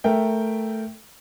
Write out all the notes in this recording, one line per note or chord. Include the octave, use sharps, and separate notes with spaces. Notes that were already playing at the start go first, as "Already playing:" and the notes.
A3 A#4 E5 G5